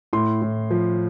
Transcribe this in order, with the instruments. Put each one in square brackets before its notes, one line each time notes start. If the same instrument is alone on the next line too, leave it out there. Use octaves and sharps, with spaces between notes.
[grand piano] A2 C6
A2
F3